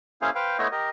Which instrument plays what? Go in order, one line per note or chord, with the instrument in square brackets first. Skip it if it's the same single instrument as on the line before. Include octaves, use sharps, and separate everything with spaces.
[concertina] A#3 C#4 E4 G#4 C5 F5
B4 C5 F5 G5
A3 B3 E4 C5 C#5 D#5
G4 A#4 D#5